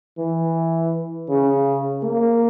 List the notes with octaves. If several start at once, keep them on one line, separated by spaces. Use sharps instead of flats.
E3
C#3
A#3